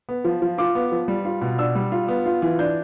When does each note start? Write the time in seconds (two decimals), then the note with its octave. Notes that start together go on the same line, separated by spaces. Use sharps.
0.09 B3
0.25 F3
0.42 F3
0.58 F4 D6
0.75 B3
0.92 F3
1.08 G3
1.25 F4
1.42 B2
1.58 D4 E6
1.75 G3
1.92 F4
2.08 B3
2.26 F4
2.42 E3
2.59 D4 G6